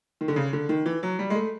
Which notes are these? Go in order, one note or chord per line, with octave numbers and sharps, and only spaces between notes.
D#3
D3
C#3
D3
D#3
E3
F#3
G3
G#3
A3